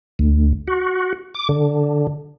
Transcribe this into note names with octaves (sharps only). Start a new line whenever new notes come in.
D2
F#4
D6
D3